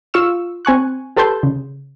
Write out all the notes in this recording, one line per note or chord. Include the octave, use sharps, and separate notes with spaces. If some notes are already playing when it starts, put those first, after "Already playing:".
F4 F5 C#6 E6 E7
C4 G#5 C#6 F#6
G4 A4 B4 A5 C6 G6
C#3